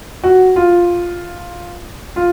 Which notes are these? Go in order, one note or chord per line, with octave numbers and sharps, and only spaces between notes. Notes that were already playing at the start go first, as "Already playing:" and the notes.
F#4
F4
F4